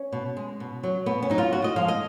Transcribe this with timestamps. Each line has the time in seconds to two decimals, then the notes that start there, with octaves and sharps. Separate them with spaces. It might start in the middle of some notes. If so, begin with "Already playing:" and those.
Already playing: C#4
0.12 B2
0.37 G#3
0.60 B2
0.83 F#3
1.06 B2 B3
1.22 C#4
1.30 F#3 D#4
1.38 F4
1.53 F#2 F#4
1.64 D#5
1.76 F3 G#3 F5
1.88 D#5